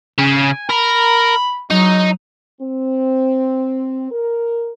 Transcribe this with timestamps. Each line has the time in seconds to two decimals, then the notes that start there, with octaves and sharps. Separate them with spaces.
0.19 C#3 G#5
0.70 A#4 B5
1.70 F#3 G#3 D#4
2.61 C4
4.11 A#4